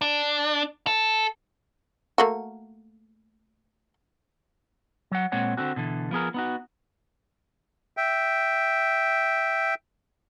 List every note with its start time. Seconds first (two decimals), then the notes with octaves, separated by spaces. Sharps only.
0.01 D4
0.87 A4
2.18 A3 A#3 F#4
5.11 F#3 F#5
5.32 A#2 G#3 C4 C#5 F#5
5.57 D3 C4 F#4
5.76 B2 D3 E3
6.11 F3 B3 G#4 A#4
6.34 B3 D#4 F#4
7.97 E5 G5